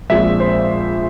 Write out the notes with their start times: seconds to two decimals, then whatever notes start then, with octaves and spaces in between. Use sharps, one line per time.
0.10 A#1 A#2 G#3 C4 E5
0.40 C5